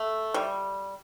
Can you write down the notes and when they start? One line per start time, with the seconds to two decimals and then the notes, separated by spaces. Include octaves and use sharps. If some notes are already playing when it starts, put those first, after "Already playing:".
Already playing: A3
0.34 G3